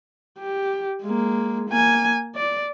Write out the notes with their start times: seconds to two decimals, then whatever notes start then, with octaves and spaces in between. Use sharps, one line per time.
0.39 G4
1.02 G#3 A#3
1.69 A#3 G#5
2.35 D5